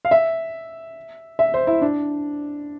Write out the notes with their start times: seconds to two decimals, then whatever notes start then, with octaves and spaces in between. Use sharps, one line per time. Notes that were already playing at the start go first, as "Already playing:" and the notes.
0.05 F5
0.11 E5
1.39 E5
1.54 C5
1.67 E4
1.82 D4